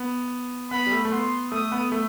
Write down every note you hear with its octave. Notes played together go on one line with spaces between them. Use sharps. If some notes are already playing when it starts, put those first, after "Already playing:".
Already playing: B3
B3 B5
G3
A3
A3
B3 C6
A3 D#6
B3
A3